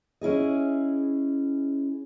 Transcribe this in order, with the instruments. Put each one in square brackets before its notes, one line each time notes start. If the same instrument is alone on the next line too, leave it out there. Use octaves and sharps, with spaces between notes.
[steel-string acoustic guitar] C#4 E4 G#4 D#5